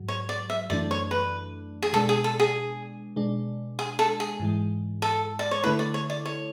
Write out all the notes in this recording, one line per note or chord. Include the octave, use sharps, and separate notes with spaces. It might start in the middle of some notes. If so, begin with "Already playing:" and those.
Already playing: G#2 F#3
C#5
D5
E5
F#2 E3 A3 D4 D5
C#5
B4
G#4
B2 G#3 D4 A4
G#4
A4
G#4
B2 G#3 D4
G#4
A4
G#4
G#2 E3 G#3
A4
D5
C#5
D3 A3 E4 B4
D5
C#5
D5
C#5